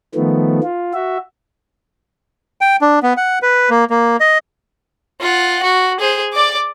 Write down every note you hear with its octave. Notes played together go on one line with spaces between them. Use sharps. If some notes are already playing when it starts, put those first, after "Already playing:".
D#3 F3 A3 B3
F4
F#4 E5
G5
D4
B3
F#5
B4
A#3
A#3
D#5
F4 F#5
F#4
G#4 C5
D5 D6